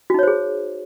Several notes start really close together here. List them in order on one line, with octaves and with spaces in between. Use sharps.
F#4 D#4 C#5 C5 G#4